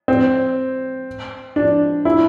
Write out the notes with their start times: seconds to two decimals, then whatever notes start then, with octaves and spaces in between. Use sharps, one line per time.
0.08 C4
1.56 D4
2.05 E4